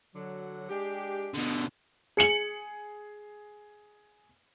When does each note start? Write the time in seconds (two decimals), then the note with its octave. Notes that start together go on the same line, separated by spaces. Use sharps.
0.15 D3 F#3
0.69 G#3 D4 G4
1.34 B2 D3
2.17 G#4 C#7 F#7